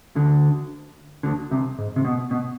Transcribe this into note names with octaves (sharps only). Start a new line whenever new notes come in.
D2 D3
D2 D3
C2 C3
G#2
C3
B2
B2